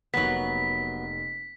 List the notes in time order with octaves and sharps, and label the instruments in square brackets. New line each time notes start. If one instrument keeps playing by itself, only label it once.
[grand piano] F1 A#3 [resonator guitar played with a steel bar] F#3 B3 [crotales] B6